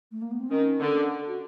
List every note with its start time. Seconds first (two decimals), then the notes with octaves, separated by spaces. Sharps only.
0.12 A3
0.22 A#3
0.31 B3
0.40 C4
0.49 D#3 C#4
0.80 D3
1.28 F#4